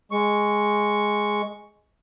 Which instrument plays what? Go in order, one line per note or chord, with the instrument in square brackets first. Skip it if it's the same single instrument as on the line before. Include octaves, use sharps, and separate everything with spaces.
[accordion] G#3 C#6